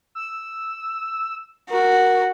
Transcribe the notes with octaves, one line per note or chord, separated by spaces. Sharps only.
E6
F#4 A#4